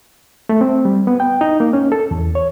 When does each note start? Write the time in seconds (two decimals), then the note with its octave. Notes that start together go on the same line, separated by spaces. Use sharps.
0.49 A3
0.61 C4
0.85 G3
1.07 B3
1.20 G5
1.41 D#4
1.60 A#3
1.73 C#4
1.92 A4
2.11 E2
2.35 C#5